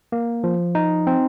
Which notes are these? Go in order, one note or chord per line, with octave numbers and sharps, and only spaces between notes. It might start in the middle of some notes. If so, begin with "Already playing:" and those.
A#3
F3
D#4
C4